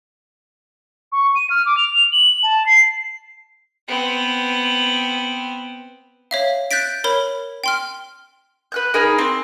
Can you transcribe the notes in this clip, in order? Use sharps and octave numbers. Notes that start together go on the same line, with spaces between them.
C#6
D#7
F6
D6
F7
F#7
A5
C7
B3 C4
C#5 E5 F5
F#6 G6 A6 B6 D7
A#4 C#5 B5
G5 C6 F6
B4 F#6 G6
D#4 G#4 A#4 B5
C4